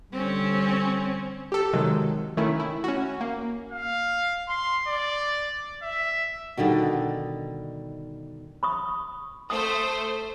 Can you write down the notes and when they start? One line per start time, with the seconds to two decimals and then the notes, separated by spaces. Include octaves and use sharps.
0.13 D3 G3 C4 C#4
1.52 G4 A4
1.73 C3 D#3 F#3 G#3
2.37 D#3 A3 C#4 E4
2.60 E4
2.84 C#4 F#4
3.21 A#3
3.72 F5
4.49 C6
4.88 D5
5.82 E5
6.57 B2 D3 D#3 G3
8.63 B5 C#6 D#6
9.50 A3 C5 D#6